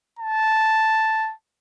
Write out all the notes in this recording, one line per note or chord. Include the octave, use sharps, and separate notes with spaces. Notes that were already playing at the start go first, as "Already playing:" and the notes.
A5